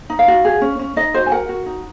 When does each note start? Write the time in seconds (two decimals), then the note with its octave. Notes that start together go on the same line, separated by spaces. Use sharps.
0.10 D#4
0.19 F5
0.28 F#4
0.45 G#4
0.61 C#4
0.79 C#4
0.96 D#4 D#5
1.14 F#4 C5
1.26 G#5
1.32 A#4 F#5
1.49 F#4
1.66 D#4